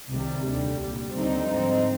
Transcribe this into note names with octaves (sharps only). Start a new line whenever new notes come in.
C2 C3 D#3 G3
D#2 D3 G3
C2 A#2 G3
D#2 D3 G3 C4 D#4
G#2 F3 C4 D#4